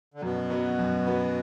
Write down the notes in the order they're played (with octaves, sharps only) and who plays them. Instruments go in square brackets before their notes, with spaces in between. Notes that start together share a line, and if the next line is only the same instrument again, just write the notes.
[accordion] D3
[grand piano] F#2 [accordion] B2
[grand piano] F#3 B3 F#4 B4
F#2
F#3 B3 F#4 B4